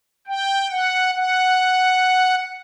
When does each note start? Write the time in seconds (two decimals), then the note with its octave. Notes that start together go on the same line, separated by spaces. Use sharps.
0.27 G5
0.71 F#5
1.15 F#5